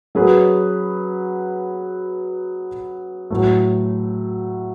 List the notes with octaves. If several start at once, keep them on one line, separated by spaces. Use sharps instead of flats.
F#3 C#4 G#4 B4
A2 F#3 A3